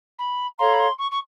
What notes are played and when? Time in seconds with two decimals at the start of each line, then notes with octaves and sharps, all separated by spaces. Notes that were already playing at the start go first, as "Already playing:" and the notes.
0.19 B5
0.58 A4 C#5 F5 A#5 C6
0.73 B5
0.79 C6
0.98 C#6
1.11 C#6